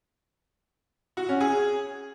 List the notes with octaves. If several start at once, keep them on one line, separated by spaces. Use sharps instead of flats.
F#4
C#4
G#4